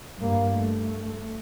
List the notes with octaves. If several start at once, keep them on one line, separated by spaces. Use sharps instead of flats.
G2 A#3
A3